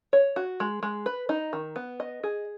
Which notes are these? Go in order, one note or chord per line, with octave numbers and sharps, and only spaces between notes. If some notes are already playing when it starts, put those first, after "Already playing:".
C#5
F#4
G#3
G#3
B4
D#4
D#3
B3
D#5
G#4